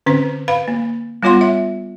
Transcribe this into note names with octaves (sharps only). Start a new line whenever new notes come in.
D3 C4 C#4 B4
B4 F5 B5
A#3
G3 B3 F4 C#5 F#5 C6
E5